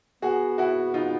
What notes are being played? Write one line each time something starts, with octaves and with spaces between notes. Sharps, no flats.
B3 F#4 G#4
E4 F#4
D#4 F4